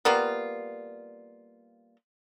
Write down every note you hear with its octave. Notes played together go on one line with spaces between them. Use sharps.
G3 A#3 B3 F4